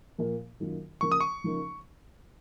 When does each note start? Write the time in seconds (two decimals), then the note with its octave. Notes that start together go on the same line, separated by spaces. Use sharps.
0.18 A#2 F3 A#3
0.60 F#2 D#3 A#3 F4
1.01 C#3 F3 A#3 C#6
1.12 D#6
1.21 C#6
1.44 C#3 F3 A#3 D#4